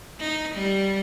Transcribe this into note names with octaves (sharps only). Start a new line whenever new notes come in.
D#4
G3